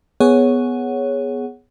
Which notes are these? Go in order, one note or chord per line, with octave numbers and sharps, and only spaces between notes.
B3 G#4 C#5 F#5